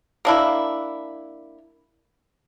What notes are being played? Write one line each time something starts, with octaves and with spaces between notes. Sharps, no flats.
A#3 D4 E4